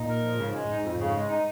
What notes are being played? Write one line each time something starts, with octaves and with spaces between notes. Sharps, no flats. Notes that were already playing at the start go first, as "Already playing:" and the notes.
Already playing: A#2 D#4
A#4
F3
G#2 C#3
G#3
G#2 D#4
F2
G#2 C#3
G#3
D#4